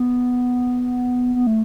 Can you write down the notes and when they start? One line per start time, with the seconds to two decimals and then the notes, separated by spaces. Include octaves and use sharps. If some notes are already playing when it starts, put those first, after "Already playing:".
Already playing: B3
1.35 B3
1.47 A3